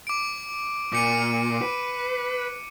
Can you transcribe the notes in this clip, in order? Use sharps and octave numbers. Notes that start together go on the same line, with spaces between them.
D6 D7
A#2 D6 C#7 D#7
B4